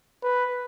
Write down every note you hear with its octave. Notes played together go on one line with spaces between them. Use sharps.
B4